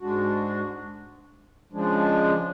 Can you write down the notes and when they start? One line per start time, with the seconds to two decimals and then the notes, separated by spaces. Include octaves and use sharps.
0.01 G#2 G#3 D4 F#4
1.73 C#3 F3 G#3 D4